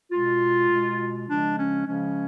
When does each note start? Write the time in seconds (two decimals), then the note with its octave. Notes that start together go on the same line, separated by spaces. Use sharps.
0.12 B2 G#3 F4
0.70 B2 G#3
1.28 C#3 F3 G#3 D4
1.57 C#4
1.85 C#3 F3 G#3 C#4